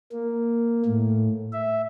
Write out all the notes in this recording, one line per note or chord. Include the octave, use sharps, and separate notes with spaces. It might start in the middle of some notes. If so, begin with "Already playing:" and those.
A#3
A2
E5